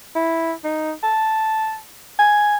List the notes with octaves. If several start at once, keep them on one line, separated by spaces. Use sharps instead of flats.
E4
D#4
A5
G#5